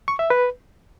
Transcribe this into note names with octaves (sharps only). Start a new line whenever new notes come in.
C#6
E5
B4